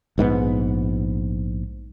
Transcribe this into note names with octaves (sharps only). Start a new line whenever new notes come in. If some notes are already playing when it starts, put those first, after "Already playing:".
A#1 G#2 D3 B3